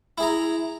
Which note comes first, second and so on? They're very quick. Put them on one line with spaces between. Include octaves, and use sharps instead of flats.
E4 G#4 A#5